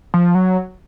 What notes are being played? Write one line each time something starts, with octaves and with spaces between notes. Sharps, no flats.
F3
F#3